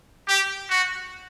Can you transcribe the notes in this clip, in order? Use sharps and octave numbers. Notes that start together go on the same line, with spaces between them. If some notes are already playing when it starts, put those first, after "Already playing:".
G4
F#4